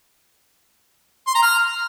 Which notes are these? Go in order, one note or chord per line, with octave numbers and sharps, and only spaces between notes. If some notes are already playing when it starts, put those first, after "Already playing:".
C6
A#5
F6